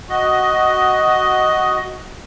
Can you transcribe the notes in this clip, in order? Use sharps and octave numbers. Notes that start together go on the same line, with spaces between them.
F#4 D#5